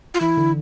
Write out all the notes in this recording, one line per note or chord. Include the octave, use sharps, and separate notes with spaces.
F4
E3 E4
D3